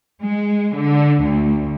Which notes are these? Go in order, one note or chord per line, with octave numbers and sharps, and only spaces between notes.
G#3
D3
D2